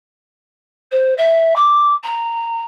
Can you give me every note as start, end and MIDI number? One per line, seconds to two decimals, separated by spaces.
0.91 1.14 72
1.17 1.55 76
1.55 1.93 86
2.03 2.63 82